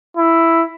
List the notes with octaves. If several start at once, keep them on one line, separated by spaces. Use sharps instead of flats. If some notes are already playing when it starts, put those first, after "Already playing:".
E4